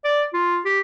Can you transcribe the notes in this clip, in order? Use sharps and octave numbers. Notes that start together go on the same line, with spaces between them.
D5
F4
G4